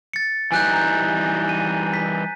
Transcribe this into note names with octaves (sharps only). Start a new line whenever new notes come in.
A6 C#7
E3 G3 D#4 G#5 F#6 G6
A#5 G6
D#7
B6